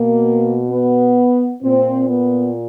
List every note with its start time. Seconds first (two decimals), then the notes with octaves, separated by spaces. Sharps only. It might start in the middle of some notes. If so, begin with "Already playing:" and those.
Already playing: B2 A#3
0.70 B3
1.63 A#2 C4
2.09 B3